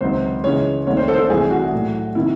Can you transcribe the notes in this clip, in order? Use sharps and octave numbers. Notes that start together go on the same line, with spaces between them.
C#2 C3 D#3 F#3 C5
C#2 C#3 E3 G#3 C#5
C2 C3 D#3 A3 C#5
C5
A4
C5
A4
C2 C3 E3 A3 G#4
F#4
A2 F#3 A3
C3 D#3 E4